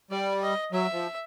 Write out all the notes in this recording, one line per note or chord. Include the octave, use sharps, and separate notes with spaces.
G3 D5
D#5
F#3 E5
F3